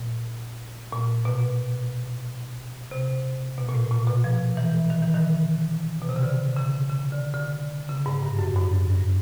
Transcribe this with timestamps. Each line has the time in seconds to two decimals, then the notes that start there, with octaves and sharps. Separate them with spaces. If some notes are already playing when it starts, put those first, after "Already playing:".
Already playing: A#2
0.92 A#2
1.25 B2
2.91 C3
3.58 B2
3.69 A#2
3.74 A2
3.91 A#2
4.07 B2
4.24 F3
4.57 E3
4.90 D#3
5.02 E3
5.14 D#3
6.02 B2
6.09 C3
6.16 C#3
6.23 D3
6.56 C#3
6.90 C#3
7.12 D3
7.34 D3
7.89 C#3
8.06 G#2
8.22 G2
8.39 F#2
8.56 G#2
8.72 F#2
8.89 G2